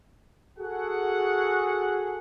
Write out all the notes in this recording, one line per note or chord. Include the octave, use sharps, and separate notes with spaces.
F#4 G#4 A4 F#5